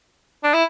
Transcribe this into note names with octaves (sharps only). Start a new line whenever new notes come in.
D4
E4